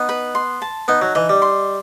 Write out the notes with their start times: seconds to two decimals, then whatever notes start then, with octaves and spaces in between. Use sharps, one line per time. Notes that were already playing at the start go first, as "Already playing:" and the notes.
Already playing: B3 D#4
0.09 B4
0.35 C6
0.62 A5
0.88 B3 D#4
1.02 F#3
1.15 E3 D#5
1.29 G3
1.42 C6